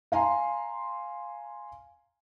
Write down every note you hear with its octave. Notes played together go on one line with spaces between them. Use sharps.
F5 G#5 A#5 C6